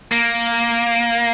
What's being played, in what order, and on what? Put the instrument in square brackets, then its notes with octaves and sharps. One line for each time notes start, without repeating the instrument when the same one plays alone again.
[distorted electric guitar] A#3